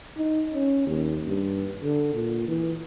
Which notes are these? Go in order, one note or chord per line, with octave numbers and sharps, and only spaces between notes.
D#4
C#4
D#2
G2
D3
A#2
E3